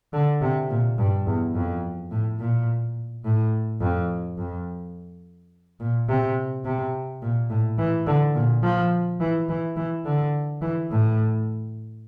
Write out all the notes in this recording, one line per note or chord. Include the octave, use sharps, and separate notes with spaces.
D3
C3
A#2
G2
E2
F2
A2
A#2
A2
F2
F2
A#2
C3
C3
A#2
A2
E3
D3
A#2
F3
E3
E3
E3
D3
E3
A2